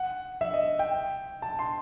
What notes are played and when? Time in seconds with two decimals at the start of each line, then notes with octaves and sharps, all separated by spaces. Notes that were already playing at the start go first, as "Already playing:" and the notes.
Already playing: F#5
0.41 E5
0.54 D#5
0.79 G5
1.42 A5
1.59 C6